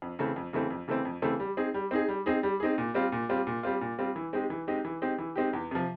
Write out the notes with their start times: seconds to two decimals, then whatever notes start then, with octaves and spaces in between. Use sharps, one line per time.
0.02 F2
0.19 C#3 E3 A3 C4
0.36 F2
0.53 C#3 E3 A3 C4
0.70 F2
0.88 C#3 E3 A3 C4
1.05 F2
1.22 C#3 E3 A3 C4
1.40 G3
1.57 C4 D#4 G#4
1.74 G3
1.91 C4 D#4 G#4
2.08 G3
2.26 C4 D#4 G#4
2.43 G3
2.60 C4 D#4 G#4
2.78 A#2
2.94 G3 C4 F4
3.12 A#2
3.29 G3 C4 F4
3.47 A#2
3.63 G3 C4 F4
3.81 A#2
3.98 G3 C4 F4
4.16 E3
4.33 G#3 C4 D#4 G4
4.50 E3
4.67 G#3 C4 D#4 G4
4.85 E3
5.02 G#3 C4 D#4 G4
5.18 E3
5.36 G#3 C4 D#4 G4
5.53 E2
5.71 C3 F3